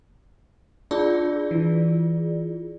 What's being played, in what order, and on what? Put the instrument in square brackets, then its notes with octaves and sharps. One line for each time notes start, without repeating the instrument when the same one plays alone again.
[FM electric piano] D4 [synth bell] F4 G#4 D5
[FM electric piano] E3